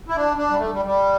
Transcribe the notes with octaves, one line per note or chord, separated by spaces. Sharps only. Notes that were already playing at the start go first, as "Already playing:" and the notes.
E4
D4
D4
G3
A3
G3
G3